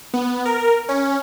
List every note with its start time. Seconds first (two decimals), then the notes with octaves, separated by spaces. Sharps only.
0.14 B3
0.45 A#4
0.89 C#4